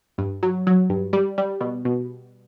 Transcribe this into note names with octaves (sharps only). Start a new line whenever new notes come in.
G2
F#3
F#3
G2
G3
G3
B2
B2